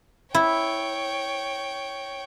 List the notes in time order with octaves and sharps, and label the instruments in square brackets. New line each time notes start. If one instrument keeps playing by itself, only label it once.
[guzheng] E4 [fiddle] C#5 G5